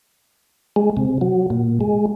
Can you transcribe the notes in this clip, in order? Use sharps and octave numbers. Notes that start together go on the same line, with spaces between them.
G#3
C3
F#3
A#2
G#3